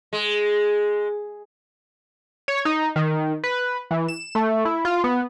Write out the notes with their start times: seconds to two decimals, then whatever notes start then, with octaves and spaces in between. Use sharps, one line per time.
0.13 G#3
2.48 C#5
2.65 D#4
2.96 D#3
3.44 B4
3.91 E3
4.08 E7
4.35 A3
4.65 E4
4.85 F4
5.04 B3